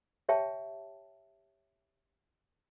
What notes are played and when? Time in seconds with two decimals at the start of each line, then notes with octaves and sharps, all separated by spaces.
0.29 G4 C#5 E5 G5 A5